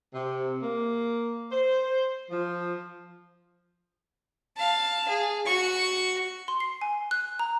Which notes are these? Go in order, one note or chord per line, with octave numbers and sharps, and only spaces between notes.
C3
A#3
C5
F3
F5 A5
G#4
F#4 C#6
C6
C7
G#5
F#6
A#5